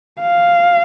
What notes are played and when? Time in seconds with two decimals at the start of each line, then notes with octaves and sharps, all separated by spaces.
0.20 F5